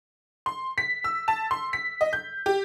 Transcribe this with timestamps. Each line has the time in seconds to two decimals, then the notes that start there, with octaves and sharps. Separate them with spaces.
0.46 C6
0.78 B6
1.04 E6
1.28 A5
1.51 C6
1.73 B6
2.01 D#5
2.13 G6
2.46 G4